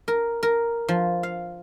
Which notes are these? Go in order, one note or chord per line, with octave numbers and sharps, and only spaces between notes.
A#4
A#4
F3
F5